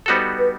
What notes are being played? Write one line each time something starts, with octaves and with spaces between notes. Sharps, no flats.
G3 B3 D#4 F#4 A4 C5
B4